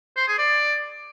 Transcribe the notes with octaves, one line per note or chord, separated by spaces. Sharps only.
C5
G#4
D5